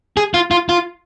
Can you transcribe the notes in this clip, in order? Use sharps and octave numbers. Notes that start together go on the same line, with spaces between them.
G#4
F4
F4
F4